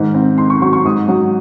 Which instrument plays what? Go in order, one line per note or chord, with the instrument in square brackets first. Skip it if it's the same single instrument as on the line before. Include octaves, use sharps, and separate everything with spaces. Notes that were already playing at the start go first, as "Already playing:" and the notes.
Already playing: [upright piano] G#2 D#3
C4
D#4 C6
C#6
F#3 C#6
C#6
G#2 D#6
F#3